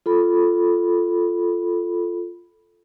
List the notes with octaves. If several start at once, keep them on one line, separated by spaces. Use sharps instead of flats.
F4 A4 B5